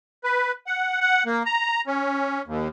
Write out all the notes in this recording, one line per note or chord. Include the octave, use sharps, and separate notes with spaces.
B4
F#5
F#5
A#3
A#5
C#4
D#2